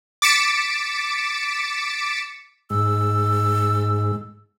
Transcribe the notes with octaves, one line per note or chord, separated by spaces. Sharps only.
D6 A6 B6 C#7 D7 E7
G#2 E6